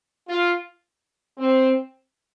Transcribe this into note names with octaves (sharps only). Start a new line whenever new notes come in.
F4
C4